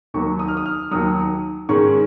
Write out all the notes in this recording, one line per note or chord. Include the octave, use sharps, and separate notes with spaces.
D#2 D#3 F#3 C#6
D#6
F6
D#6
F6
D#2 D#3 F#3 D#6
G#2 D#3 G#3 C#4 C#6